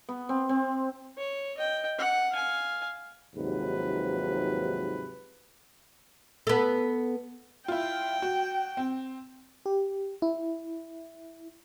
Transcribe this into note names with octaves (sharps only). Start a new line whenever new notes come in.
B3
C4
C4
C#5
D#5 G5
F#5
F5 G#5
D#2 G#2 C3 F3 F#3 B4
B3 A4
E4 F4 G5
F#4
C4
G4
E4